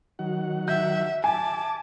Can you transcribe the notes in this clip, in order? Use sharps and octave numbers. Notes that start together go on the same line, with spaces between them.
D#3 F#3 F#5
E5 G6
G#5 A5 D6